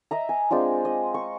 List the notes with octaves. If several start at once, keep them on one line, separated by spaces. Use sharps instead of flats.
D#5 E5 A#5
G#5
G#3 C4 D4 F4
D#5
C#6